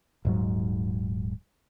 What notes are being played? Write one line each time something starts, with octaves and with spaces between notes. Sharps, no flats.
D#1 G#2 F#3